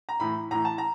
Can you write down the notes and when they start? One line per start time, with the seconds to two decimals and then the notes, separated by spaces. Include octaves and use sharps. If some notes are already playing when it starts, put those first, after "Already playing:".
0.09 A#5
0.20 A2 E3 B5
0.51 A2 E3 A#5
0.65 A5
0.78 A#5